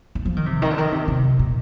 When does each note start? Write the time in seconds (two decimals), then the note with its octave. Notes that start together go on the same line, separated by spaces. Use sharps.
0.15 D#3
0.25 F3
0.37 D#3
0.46 C3
0.62 D#3
0.70 D3
0.78 D#3
0.92 C3
1.08 C3
1.39 A#2